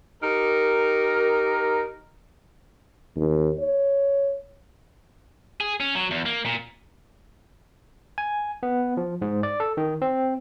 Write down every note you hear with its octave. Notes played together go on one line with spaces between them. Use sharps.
D#4 G4 A#4
D#2
C#5
G#4
C#4
F#3
E2
A#3
A#2
G#5
B3
F3
G#2
D5
A4
D#3
C4